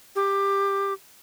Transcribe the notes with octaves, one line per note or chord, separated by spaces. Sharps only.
G4